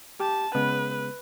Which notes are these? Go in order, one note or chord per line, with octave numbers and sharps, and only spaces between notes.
G4 A5
C#3 G#3 B3 B4